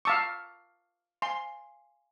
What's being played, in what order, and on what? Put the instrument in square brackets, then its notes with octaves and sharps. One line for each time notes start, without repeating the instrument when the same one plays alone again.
[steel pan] F5 A5 C#6 [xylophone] D6 E6 B6
[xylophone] F5 G#5 [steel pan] C6